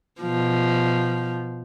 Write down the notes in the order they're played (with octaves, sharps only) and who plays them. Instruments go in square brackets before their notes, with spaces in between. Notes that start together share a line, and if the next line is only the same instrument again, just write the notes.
[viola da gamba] B2 F3